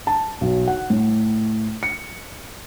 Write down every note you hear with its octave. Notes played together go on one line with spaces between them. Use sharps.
A5
B1
F#5
A2
C#7